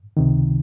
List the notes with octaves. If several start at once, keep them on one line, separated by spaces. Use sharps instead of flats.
C#2 C3 D#3